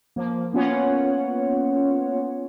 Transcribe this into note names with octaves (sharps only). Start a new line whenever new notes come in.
F3 A#3
A#3 B3 C#4 F4 C#5 F#5